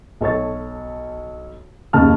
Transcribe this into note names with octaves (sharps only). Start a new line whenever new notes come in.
B1 A4 C#5 A6
F#1 D#2 C#3 A5 F6